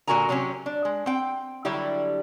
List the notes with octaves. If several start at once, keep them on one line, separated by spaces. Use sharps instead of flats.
A#2 D3 F#4 A#4 G#5 A#5
C3 F#3 C4 C#4 G4
D4
G#3
C4 G5
D3 F#3 G3 E4 G4